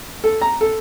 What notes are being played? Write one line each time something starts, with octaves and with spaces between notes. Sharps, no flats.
A4
A#5
A4